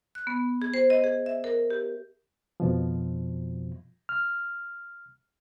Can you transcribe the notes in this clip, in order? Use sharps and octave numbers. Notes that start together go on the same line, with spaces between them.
F#6
B3
G#4
C5
D#5
G#4
E5
A#4
G4
F2 B2 F3
F6